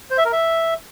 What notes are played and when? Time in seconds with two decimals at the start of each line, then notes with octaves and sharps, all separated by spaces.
0.11 C5
0.18 E5
0.25 A#4
0.33 E5